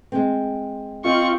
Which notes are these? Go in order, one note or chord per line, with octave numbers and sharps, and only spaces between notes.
G#3 C4
C4 F4 D#5 C#6